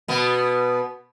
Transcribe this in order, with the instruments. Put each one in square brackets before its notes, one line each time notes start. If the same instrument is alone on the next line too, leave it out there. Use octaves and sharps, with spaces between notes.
[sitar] B2 B3